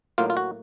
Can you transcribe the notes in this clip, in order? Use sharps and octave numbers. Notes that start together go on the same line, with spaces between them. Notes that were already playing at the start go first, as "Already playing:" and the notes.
A2 F#3 A#3 F4
F4
F#4